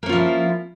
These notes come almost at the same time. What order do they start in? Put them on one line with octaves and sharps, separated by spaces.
A#3 C#4 F4 F3 E4